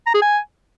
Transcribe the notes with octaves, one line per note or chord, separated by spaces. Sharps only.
A#5
G#4
G#5